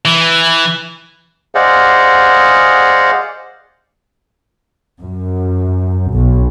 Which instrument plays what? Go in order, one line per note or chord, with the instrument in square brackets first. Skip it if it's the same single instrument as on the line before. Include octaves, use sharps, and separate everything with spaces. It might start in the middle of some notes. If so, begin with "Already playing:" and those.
[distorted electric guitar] E3
[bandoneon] G#4 C5 D5 D#5 F5 F#5
[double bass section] F#2
B1